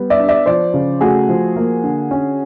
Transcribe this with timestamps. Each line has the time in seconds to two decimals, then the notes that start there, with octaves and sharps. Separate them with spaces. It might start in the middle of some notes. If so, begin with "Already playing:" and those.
Already playing: G3 B3
0.10 D5 E5
0.20 D4
0.28 D5 E5
0.46 F3 C5 D5
0.74 C#3
1.01 A3 F#4 G#4
1.29 F3
1.56 A#3
1.84 D3
2.11 C#4